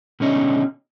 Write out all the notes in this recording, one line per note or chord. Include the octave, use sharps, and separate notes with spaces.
B2 D3 G#3 C#4 D#4